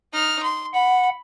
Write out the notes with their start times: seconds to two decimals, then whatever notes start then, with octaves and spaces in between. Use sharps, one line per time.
0.13 D#4 F6
0.43 C6
0.74 F#5 B5